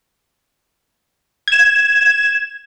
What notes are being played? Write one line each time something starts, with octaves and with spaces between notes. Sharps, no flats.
G#6 E7